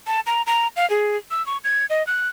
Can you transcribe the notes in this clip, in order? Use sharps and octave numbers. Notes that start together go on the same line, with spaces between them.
A5
A#5
A#5
F5
G#4
E6
C#6
G#6
D#5
F#6